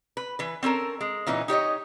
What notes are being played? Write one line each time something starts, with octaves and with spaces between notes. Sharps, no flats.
B4
E3 B4
C4 C#4 A4 A#4
G#3
A#2 E3 C#4 D#4
D#4 G4 C#5 D#5